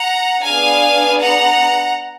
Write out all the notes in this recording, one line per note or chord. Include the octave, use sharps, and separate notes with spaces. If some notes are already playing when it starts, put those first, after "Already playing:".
Already playing: F#5 A#5
B3 D4 G#4 F5 G#5
F#5 A#5